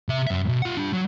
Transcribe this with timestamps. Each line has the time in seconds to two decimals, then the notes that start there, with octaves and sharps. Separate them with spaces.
0.09 C3 E5
0.27 F#2 E5
0.48 B1
0.62 F4 F#5
0.77 D4 G4
0.93 F#3